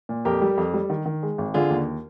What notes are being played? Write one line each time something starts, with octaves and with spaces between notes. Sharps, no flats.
A#2
F2 G4 A#4
G3
F2
G3
D#3
D#3
G#3
G#1
D3 F4 G#4
D#2